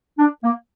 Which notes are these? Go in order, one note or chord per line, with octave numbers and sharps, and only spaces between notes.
D4
A#3